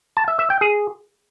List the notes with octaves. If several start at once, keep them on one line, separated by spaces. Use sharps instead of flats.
A5
E5
E5
G5
G#4